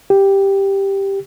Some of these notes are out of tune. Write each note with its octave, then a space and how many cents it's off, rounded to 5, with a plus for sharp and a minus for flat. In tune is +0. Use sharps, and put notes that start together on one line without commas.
G4 +5